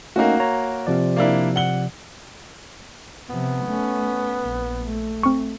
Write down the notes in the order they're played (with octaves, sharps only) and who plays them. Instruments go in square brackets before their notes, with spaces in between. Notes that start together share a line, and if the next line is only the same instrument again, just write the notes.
[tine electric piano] A3 C#4 D#4 [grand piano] A#3 F#4
[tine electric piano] C#5 A#5
C3 F3 D5
[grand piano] A#3 D4 E4
F#5 G7
[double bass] C3 F3 [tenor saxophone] B3
[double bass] A3 C#4
A#1
A3
[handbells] C4 C#6